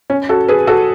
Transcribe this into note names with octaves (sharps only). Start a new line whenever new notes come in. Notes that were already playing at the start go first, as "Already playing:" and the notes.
C#4
F#4 A4
G#4 B4
F#4 A4